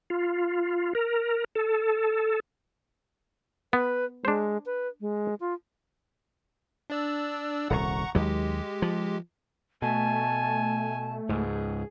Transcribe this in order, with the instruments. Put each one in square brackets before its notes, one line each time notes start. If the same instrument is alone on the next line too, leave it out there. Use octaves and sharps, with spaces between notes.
[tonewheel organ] F4
A#4
A4
[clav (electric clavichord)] B3 [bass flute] B4
[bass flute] G#3 [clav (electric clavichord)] D4 C5
[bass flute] B4
G#3
F4
[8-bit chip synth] D4 D5 E6
[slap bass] D#1 C2 [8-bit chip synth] F#5 A#5 C#6
[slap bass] D#2 F#3 [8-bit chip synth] G#3 G4
[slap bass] F3
[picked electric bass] B2 [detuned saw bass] A3 [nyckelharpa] G#5 [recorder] A5
[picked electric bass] C#2 G#2 [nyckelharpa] G#4